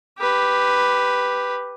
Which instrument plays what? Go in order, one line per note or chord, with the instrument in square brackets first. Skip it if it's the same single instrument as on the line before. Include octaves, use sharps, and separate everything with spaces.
[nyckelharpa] G4 B4